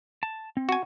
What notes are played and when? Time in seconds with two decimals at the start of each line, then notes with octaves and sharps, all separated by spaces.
0.23 A5
0.57 C4
0.69 F#4 G#5